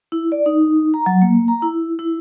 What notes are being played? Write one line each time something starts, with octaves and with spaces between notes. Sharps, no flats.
E4
D5
D#4
A#5
F#3
A#3
A#5
E4
E4